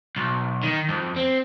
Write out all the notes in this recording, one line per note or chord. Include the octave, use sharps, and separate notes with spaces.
B1
D#3
F2
C4